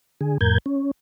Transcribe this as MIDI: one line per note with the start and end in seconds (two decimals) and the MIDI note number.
0.21 0.38 50
0.21 0.38 68
0.41 0.58 41
0.41 0.58 45
0.41 0.58 70
0.41 0.58 91
0.41 0.58 92
0.66 0.91 61